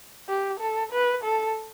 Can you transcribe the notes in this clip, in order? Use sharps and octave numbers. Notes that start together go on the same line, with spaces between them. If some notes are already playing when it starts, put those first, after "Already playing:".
G4
A4
B4
A4